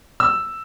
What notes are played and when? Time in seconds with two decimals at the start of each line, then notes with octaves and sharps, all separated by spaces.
0.20 E6